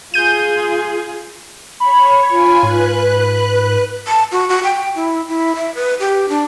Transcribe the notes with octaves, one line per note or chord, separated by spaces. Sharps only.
F4 G#4 G6 D#7
C#5 B5
F4 G#5
G#2 B4 F#6
A5
F#4
F#4
G5
E4
E4
E5
B4
G4
D4